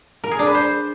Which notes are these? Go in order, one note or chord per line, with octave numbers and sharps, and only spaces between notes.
A#4
G#4
D4
B4
C5